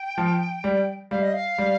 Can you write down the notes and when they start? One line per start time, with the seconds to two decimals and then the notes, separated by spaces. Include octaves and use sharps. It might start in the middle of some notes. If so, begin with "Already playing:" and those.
Already playing: G5
0.18 F3
0.64 G3
1.11 G3 F5
1.22 D#5
1.33 F5
1.58 G3